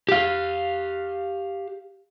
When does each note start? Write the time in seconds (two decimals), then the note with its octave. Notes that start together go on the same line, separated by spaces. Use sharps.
0.09 G4 F5